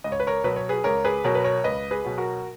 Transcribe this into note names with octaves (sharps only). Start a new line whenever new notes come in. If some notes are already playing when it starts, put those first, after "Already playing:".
C#2 D#5
C#5
B4
A#4 C#5
B2 F#3 B4
C#5
G#4 B4
C#2 A#4 C#5
G#4 B4
B2 F#3 A#4 C#5
B4
A#4 C#5
C#2 B4 D#5
G#4 B4
B2 F#3
F#4 A#4